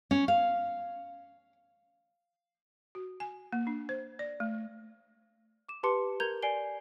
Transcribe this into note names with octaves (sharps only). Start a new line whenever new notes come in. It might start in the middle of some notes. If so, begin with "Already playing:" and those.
C#4
F5
F#4
G#5
A#3
D4
C5
D5
A3
D6 E7
G4 B4 A5 C6 D6 C#7
A#4 A#5 G6 G#6 F7 G7
D5 G#5 C7 D7 G7